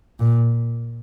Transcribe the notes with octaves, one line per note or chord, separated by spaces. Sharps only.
A#2